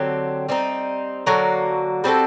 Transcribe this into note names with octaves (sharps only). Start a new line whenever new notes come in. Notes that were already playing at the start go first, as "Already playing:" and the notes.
Already playing: D3 F#3 C4 G4
G3 C4 D#4
D3 F#3 A#3 F#4
G3 C4 F#4 A4